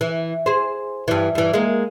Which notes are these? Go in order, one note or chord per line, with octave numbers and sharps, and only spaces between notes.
E3
G#4 C5
G2 E3
G2 E3
G#3 A#3